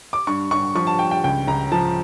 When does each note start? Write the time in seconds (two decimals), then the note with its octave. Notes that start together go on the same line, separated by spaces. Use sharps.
0.13 D6
0.27 G2 C#6
0.51 G2 C#6
0.75 F3 C#6
0.87 A5
0.99 G2 G5
1.11 G5
1.24 C#2 G5
1.48 C#2 A#5
1.72 F3 A5